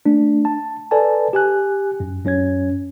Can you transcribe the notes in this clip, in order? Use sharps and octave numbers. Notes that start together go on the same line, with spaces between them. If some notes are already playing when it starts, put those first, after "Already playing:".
A3 D4
A5
A4 B4 D5 G#5 A5
G4 G#5 F#6
F#2
F#2 C#4 C#5 G#6